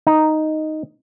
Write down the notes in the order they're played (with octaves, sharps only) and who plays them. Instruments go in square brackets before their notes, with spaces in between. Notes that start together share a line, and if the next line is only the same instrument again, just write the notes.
[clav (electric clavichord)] D#4